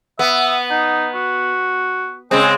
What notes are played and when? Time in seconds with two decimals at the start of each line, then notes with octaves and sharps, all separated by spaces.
0.19 B3 E5
0.70 D#4
1.15 F#4
2.31 C#3 G#3 C4 G#4